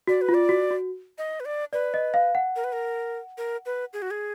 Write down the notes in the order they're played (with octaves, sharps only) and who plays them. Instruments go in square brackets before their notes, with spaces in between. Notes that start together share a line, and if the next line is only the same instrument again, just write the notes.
[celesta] F#4 [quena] D5
[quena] B4
[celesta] F4
[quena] D5
[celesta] F#4
F#4
[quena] D#5
B4
D5
[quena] B4 [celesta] D5
[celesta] D#5
F5
F#5
[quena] A#4
B4
A#4
A#4
B4
G#4
F#4
G#4